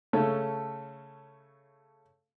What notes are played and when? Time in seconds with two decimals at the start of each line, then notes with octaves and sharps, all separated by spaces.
0.13 C#3 A3 C#4 A4